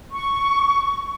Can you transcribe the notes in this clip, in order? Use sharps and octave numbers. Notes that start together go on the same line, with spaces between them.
C#6